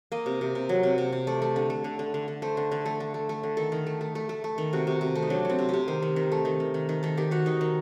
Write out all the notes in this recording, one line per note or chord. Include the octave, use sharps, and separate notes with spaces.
A#3 D#5
C3
C3
C3
F#3
C3
C3
C3
A3 D5
A3
D3
A3
D3
D3
D3
D3
A3 C5
D3
D3
A3
D3
A3
A3
D3
D#3 A4
D#3
A3
A3
A3
A3
A3
D#3
C3 F#4
C3
C3
A3
D#4
F#3 D4
F#3 C4
C3
C3 G4
D#3 C5
D#3
D#3
A3
D#3
D#3
D#3
D#3
D#3 A4
D#3 G4
D#3 F#4
D#3 D#4
D#3